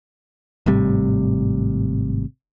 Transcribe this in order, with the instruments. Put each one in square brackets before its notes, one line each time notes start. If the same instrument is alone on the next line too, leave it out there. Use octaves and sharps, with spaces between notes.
[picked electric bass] G#1 A2 C3 G3